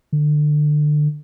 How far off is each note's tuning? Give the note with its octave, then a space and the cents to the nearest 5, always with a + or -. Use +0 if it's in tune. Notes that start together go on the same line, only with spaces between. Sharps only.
D3 +25